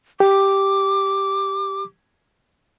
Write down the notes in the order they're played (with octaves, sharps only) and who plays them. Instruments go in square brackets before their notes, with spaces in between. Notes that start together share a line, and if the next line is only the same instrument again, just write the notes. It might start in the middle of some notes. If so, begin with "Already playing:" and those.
[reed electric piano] G4 [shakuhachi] D6